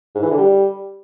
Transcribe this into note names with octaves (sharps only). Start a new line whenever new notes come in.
G#2
E3
D3
G3